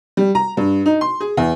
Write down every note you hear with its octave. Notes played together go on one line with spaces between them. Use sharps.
G3
A#5
G2
D#4
C6
G#4
E2